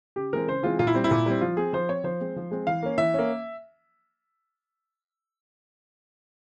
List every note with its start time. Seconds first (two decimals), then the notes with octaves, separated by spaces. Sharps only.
0.16 C#3 G4
0.33 E3 G#3 C4 A#4
0.48 C#3 C5
0.63 E3 G#3 C4 F4
0.79 A#2 F4
0.87 E4
0.94 G3 C4
1.04 E4
1.11 A#2
1.26 G3 C4
1.41 F3 F4
1.57 C4 G#4
1.73 F3 C5
1.89 C4 C#5
2.04 F3 C5
2.21 G#3 C4
2.36 F3
2.51 G#3 C4
2.67 E3 F5
2.83 A#3 C#4
2.98 E3 E5
3.14 A#3 C#4